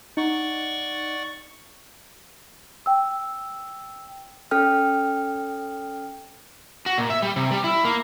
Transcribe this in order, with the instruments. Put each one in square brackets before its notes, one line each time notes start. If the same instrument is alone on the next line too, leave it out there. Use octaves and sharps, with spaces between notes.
[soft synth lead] D#4 [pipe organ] D5 F#5 C#6
[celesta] G5 E6
[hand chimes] C#4 A4 G5 F6
[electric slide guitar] F#4
A#2
E5
G3
C3
G3
E4
A#3